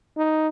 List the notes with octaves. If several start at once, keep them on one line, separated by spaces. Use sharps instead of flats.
D#4